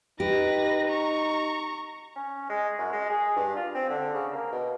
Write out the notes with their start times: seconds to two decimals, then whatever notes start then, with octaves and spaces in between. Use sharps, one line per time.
0.20 D#4 G4 B4 A#6
0.88 A#5 C#6
2.16 C#4
2.49 G#3
2.78 F#2
2.92 G#3
3.10 G#4
3.36 G2
3.56 F4
3.75 C4
3.89 D3
4.14 C#3
4.33 A#3
4.52 B2